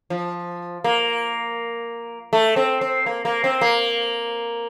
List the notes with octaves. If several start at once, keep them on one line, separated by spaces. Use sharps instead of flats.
F3
A#3
A3
C4
C4
A#3
A#3
C4
A#3